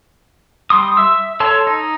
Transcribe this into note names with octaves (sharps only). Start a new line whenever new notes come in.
G3 C6 D#6
E5 E6
A4 C#5 A5 C6 E6
D#4